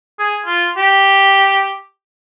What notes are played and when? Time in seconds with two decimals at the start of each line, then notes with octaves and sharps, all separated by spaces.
0.19 G#4
0.46 F4
0.77 G4